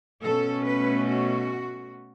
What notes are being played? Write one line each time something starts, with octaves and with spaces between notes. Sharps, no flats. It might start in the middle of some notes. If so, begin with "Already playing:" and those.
B2 A3 C#4 A4
B4
F#4